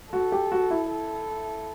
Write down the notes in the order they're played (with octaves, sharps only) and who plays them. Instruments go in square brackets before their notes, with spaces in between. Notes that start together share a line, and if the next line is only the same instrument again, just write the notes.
[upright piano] F#4 [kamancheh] A4
[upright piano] G4
F#4
E4
[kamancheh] A4